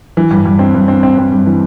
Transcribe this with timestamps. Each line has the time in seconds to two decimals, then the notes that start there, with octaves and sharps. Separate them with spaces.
0.17 E3
0.31 G2
0.45 G2
0.59 C4
0.74 G2
0.88 C4
1.03 C4
1.18 C4
1.32 G2
1.46 E3